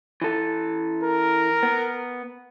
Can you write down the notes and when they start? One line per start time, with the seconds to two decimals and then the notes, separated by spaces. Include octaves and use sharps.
0.22 E3 A4
1.03 A#4
1.63 B3